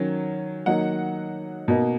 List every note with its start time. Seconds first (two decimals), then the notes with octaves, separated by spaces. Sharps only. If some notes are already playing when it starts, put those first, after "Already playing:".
Already playing: D#3 F#3 C#4
0.66 D#3 F#3 A#3 D#4 F#5
1.68 B2 A#3 D#4